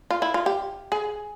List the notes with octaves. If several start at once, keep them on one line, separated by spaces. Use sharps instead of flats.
F4
E4
F4
G4
G#4